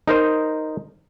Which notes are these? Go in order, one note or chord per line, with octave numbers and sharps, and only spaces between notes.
D#4 A#4 C5 D#5